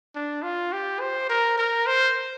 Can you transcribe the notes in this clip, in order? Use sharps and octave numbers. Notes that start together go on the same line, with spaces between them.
D4
F4
G4
C5
A#4
A#4
C5